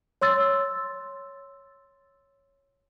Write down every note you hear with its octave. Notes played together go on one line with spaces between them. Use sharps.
C#5 C6 E6 A6